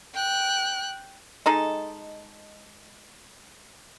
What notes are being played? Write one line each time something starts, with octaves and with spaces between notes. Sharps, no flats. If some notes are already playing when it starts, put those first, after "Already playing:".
G5 F#6
G#3 D#4 A4